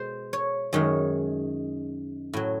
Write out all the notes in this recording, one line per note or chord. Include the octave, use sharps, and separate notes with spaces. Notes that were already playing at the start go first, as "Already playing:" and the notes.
Already playing: B2 G#3 C5
C#5
F#2 D#3 G#3 C#5
A2 F#3